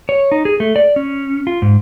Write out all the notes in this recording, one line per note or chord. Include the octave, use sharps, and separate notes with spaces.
C#5
D#4
G#4
A3
D5
C#4
F4
G#2